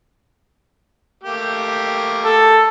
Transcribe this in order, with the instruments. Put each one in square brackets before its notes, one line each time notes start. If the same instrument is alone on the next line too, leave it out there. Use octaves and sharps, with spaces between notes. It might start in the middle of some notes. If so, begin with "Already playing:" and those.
[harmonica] A3 A#3 G4
[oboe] A4